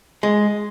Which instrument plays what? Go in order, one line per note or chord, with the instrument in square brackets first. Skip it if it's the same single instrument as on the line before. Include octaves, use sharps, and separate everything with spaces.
[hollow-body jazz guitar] G#3